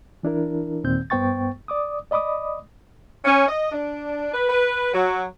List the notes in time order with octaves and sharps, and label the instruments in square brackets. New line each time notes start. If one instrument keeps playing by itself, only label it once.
[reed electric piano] E3 D4 E4 A#4
D#2 A#2 D#3 C4 G6
G2 B3 C5 G5 C#6 A6
D5 D6 D#6
D5 D#5 B5 D6 D#6
[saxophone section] C#4
D#5
D4
B4
B4
F#3